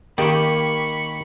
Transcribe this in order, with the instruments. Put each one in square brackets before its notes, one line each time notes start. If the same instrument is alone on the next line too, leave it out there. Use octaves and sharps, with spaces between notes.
[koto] D#3 [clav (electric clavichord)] A#3 G4 [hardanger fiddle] B5 C#6